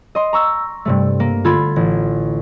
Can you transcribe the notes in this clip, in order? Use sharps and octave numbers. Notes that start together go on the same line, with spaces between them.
D#5 C6
A#5 C#6 E6
G2 C3 A3
A#3
D3 F4 A4 B5 G#6
A1